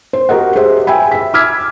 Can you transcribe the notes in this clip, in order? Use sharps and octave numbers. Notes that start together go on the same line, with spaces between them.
C5
F#4 G4 A#4 D#5 F#5
G4 G#4 C5 E5
E5 G5 G#5 B5
E5 B6
D6 E6 F6 G#6 B6